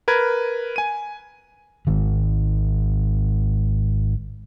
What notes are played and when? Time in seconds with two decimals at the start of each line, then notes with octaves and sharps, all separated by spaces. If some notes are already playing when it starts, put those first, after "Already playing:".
0.08 A#4 B4 G#6
0.76 G#5 D#7
1.87 G#1 D#3